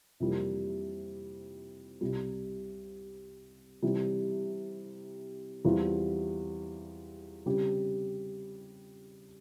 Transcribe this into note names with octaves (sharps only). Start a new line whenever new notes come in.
F2 C3 E3 G3 A#3
C2 C3 G3
C3 E3 G3
E2 E3 G3 C4 F4
C#3 G3 C4 G4